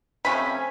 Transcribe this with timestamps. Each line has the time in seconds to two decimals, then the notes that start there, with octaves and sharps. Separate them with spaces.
0.25 C3 F3 A3 C#4 B5